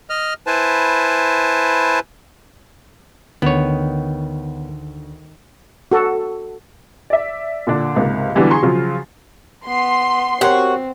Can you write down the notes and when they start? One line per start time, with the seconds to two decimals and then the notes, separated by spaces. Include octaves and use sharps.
0.10 D#5 F6
0.47 E4 B4 C5 G#5 A5
3.42 D2 D#3 B3 C#5
5.92 F#4 A4
7.10 D5 E5
7.67 A#2 D3 D4
7.96 C#2 G#2 C3 A#3
8.35 D3 E3 F#3 G3 B3 D4
8.50 G#4 A#5 C6 C#6
8.62 C#3 F3 F#3 F4 G#4
9.68 B3 C6
10.41 C4 F#4 G4 A#4 C#5